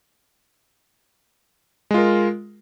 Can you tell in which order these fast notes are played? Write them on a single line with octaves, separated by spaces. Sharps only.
G#3 F4 A#4